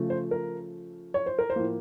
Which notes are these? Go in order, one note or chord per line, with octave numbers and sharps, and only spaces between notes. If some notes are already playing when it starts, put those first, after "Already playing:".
Already playing: C#3 F3 A3
C5
A#4
C#5
C5
A#4
C5
A2 F3 A#3